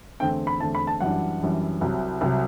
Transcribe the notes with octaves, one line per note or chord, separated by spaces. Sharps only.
E2 D3 A3 C4 G5
B5
E2 D3 A3 C4 A5
B5
A5
F#2 E3 G3 D4 F#5
F#2 E3 G3 D4
C2 C3 F#3
C2 C3 F#3